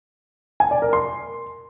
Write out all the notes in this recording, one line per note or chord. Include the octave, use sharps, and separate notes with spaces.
G#5
D5
A#4
C6